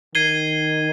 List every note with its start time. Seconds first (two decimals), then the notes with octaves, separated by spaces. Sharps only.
0.15 D#3 G#6 C7 D#7 G7